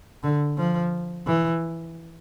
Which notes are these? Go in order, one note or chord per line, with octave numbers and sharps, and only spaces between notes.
D3
F3
E3